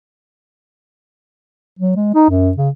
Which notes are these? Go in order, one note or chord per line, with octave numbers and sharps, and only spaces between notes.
F#3
G#3
D#4
F#2
C#3